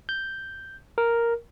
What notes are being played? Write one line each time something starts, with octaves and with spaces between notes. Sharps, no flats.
G6
A#4